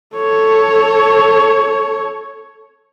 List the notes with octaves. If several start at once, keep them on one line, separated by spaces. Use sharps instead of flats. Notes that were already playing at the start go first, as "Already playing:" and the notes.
A4 C#5